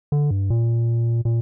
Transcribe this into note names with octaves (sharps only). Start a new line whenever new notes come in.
D3
G2
A#2
A#2